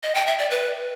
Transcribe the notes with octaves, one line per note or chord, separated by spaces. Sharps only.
D#5
G5
E5
D5
B4